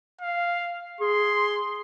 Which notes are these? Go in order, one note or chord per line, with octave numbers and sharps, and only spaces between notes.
F5
G#4 C6